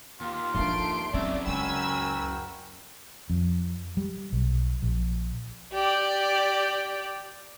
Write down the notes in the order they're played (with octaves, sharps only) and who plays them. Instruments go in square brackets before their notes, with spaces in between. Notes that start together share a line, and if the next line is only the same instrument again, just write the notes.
[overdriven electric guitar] D#2 [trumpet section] F4
[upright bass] F3 D4 [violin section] A3 C6 D7
[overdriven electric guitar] F#2 C#3 [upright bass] C4 [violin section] D5 [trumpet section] E5
[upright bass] C#2 [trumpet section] F#4 A#4 G5 [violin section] G#5 B5 E6
[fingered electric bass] F2
G3
B1
A#1
[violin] G4 D5